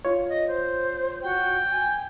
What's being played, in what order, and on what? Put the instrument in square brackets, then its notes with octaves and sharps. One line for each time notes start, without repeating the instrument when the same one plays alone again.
[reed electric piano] F4 C#5
[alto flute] D#5
C5
[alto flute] F#4 [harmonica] G5
[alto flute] G#5